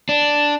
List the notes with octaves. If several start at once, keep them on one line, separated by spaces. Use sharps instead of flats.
D4